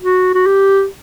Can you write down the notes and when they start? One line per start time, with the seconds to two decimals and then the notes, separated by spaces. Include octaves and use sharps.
0.02 F#4
0.34 F#4
0.46 G4